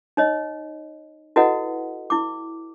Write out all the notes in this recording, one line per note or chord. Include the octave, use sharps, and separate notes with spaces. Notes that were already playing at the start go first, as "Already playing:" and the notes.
D#4 C#5 D#5
E4 F#4 A4 B4 D#5 F#5
E4 D6